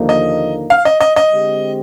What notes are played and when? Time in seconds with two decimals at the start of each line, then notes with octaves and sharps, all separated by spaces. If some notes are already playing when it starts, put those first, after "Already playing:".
Already playing: D#2 D3 F3 A#3 D#4
0.09 D#5
0.70 F5
0.85 D#5
1.00 D#5
1.16 D#5
1.32 D3 G#3 C4 G4